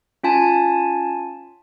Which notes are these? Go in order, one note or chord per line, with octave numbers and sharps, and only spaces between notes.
C#4 F4 G#5 A5